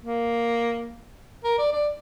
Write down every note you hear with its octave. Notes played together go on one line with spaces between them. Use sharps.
A#3
A#4
D5
D5